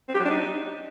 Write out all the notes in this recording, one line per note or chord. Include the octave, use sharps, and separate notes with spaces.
C4
G4
F#3
D4
D#4